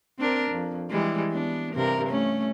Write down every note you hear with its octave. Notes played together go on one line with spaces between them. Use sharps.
C4 D4 A#4
F2
E3 G3 G#3
B3 D4
G2 C3 A#4
A3 C#4